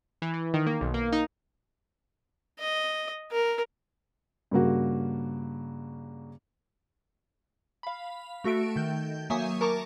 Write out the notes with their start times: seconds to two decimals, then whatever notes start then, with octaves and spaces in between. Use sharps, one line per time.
0.22 E3
0.34 E3
0.54 D#3
0.66 A#3
0.81 B1
0.94 A#3
1.13 D#4
2.59 D#5
3.31 A#4
4.51 G2 C#3 A#3 F#4
7.83 F5 B5
8.44 A3 F#4 A4 E5 D7
8.76 D#3 G6
9.30 F#3 A#3 E5 G#5 C#6 D#6
9.61 A#4 A5 A#5 C#6 D6